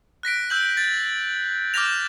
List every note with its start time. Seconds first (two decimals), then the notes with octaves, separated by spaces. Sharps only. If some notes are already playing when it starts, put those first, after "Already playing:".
0.23 F#6 A#6 B6 D7
0.50 E6 G6 F#7
0.77 A6
1.74 D6 F6 G6 A#6 F7